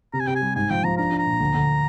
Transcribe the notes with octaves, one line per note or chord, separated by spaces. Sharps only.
C3 A#5
G#5
C3 G5
G#5
G3
G#2 G#5
F3 G5
F3 A#5
D4 A#5
D4
A#5
A#2
D2
D2